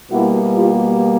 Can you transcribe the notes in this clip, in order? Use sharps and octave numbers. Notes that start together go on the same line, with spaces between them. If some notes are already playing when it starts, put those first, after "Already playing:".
B2 G3 A#3 E4 F#4
F4 G4